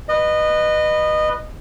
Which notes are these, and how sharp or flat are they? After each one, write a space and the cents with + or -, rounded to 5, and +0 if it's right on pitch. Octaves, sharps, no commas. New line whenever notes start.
B4 +0 D#5 -20